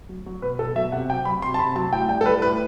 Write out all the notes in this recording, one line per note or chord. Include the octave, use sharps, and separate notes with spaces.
F#3
F#3
B2 B4
B2 A4
F#3 E5
C3 F#5
F#3 G5
F#3 B5
C3 C6
A5
C3 B5
F#3 A5
A2 G5
G3 G5
A4
G3 B4
A2 B4